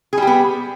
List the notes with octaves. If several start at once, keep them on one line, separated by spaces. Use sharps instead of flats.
G3 B3 G4 G#4